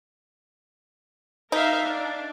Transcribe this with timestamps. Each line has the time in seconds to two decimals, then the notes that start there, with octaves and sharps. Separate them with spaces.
1.52 D#4 A#4 E5 F5
1.83 D4